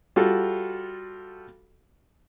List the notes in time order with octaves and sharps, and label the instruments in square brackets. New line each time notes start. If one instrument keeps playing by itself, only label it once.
[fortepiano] G3 F4 F#4 A4